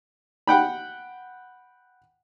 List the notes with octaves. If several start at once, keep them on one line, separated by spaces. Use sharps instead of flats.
F#5 G5 B5